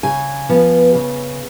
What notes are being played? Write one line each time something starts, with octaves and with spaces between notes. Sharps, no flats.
C#3 G#5
F3 B3
C#3